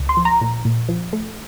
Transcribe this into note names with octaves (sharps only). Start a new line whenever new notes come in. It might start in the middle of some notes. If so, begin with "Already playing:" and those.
Already playing: C#2
C6
F3
A#5
A#2
A#2
F3
A3